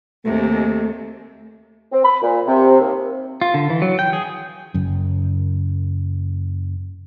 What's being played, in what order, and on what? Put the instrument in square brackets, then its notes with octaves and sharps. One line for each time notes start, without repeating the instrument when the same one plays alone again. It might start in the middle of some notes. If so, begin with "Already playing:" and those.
[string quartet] D#2 C3 [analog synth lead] A3
[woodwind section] C4
B5
A#2
C3
D#2
[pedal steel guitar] F4
D3
E3
F#3
G5
G#4
[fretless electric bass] F#1 F#2